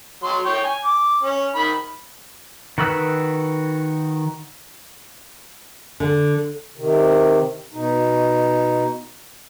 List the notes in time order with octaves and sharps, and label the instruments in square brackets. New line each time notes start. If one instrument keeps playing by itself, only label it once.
[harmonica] F#3 C6
C#5 G5
G#5
D6
C#4
D#3 B5
[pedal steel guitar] D#3 F#4 B4 E6 F#6
[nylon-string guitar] D3
[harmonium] C3 D#3
B2 D#4